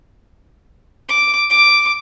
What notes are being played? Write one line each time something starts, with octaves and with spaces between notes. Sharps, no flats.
D6
D6